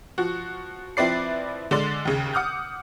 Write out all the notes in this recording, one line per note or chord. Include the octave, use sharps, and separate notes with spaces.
F3 F#4
F3 C4 E4 B4 D5 C7
D3 G#3 D5 C6
D#2 C#3
F#5 D6 D#6 F6 G6